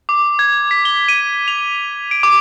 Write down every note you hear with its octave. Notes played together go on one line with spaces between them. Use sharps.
D6
G#6
B6
G7
D#7
F7
D7
D6